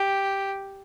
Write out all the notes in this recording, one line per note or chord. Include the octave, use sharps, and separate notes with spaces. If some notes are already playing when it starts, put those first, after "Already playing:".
Already playing: G4